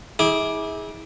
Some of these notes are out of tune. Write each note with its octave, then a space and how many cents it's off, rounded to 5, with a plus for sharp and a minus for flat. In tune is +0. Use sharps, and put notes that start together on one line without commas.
E4 -35 G#4 +0 D6 +0